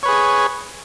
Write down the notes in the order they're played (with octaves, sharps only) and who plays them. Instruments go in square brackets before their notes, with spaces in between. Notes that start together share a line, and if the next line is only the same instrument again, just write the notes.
[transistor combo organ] C#5
B4
G#4